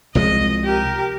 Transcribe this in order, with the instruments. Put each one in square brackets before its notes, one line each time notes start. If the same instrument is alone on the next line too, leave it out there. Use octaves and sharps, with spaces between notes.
[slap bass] C2 F3 G#3 [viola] D#5
[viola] G4 A#4